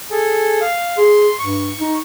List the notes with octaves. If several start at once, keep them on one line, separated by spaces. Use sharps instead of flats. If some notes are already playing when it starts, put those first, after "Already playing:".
G#4 A4
F5
G#4 C6
G2 C#6
D#4